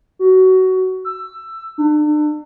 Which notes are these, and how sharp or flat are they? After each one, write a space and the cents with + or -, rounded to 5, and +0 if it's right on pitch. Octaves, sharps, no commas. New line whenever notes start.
F#4 +20
E6 +10
D4 +40